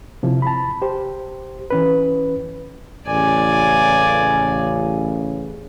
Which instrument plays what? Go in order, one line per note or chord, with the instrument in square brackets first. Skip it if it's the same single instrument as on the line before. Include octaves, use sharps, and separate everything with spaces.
[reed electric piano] C3 F3 E4
A5 B5
G4 C5
E3 C#4 B4
[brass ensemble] A1 C#3 [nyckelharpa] D5 G#5